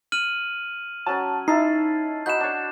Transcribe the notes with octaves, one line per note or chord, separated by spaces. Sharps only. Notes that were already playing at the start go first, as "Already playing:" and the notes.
F6 D#7 F#7
F#3 C#4 G#5 A5
D#4 E4 A5 C7
D#4 F#4 B5 G6 E7
D4 C#5